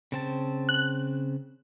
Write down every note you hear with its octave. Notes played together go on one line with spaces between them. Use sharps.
C#3 C4 A5
F#6